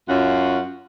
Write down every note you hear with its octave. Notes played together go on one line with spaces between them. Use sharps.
F#2 C#4 F4 F#5